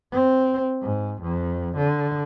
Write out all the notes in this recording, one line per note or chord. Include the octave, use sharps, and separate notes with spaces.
C4
G#2
F2
D3